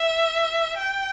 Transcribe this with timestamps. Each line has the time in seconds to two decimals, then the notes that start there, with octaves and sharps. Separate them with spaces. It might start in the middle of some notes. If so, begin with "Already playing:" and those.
Already playing: E5
0.77 G5